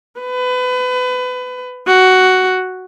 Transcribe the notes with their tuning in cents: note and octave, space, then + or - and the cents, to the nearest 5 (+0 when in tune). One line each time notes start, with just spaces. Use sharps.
B4 +25
F#4 +10